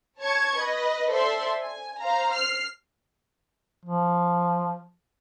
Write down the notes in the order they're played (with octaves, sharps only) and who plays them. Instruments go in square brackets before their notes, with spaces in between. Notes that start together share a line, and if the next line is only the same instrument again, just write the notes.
[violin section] C#5 A5 C#6 G#6 C#7
B4 D#5
A4 C5 D5 E5 C6
G#5
C5 F5 A#5
F6 C7
[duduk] F3